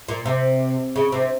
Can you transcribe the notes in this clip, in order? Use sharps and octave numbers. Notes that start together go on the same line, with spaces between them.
A#2
C3
C#3
C3